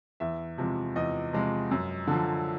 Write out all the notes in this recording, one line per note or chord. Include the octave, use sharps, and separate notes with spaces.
E2 E5
C3 F3 G#3
E2 D#5
C3 F3 G#3
F#2
D3 F3